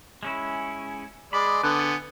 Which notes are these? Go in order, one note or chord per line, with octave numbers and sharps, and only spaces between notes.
G#3 C#4 E4
G#3 D5 B5
D3 B3 G#5 D6 F#6